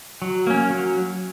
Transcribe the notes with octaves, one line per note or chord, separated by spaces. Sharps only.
F#3
A#3 C#4
F#3